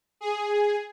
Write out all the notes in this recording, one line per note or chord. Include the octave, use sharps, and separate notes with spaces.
G#4